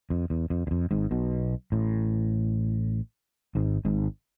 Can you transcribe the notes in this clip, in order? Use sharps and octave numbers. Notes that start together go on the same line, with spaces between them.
F2
E2
F2
E2
F2
G#1 G#2
B1 B2
A1 A2
G#1 G#2
G#1 G#2